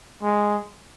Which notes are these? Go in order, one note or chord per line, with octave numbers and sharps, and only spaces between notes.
G#3